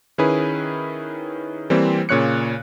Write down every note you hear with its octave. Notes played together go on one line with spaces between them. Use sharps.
D#3 C#4 E4 G#4 B4
E3 G3 A#3 C4
A#2 C#3 C#5 F#6 C#7